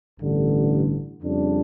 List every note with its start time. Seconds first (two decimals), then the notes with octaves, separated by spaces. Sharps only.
0.18 A1 G2 D3
1.22 F2 C#3 G3 D4